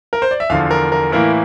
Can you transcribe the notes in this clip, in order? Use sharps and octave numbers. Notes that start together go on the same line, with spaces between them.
A#4
C5
D5
E5
E2 D3 F3 F5
A#4
A#4
A2 E3 A#3 E4 A#4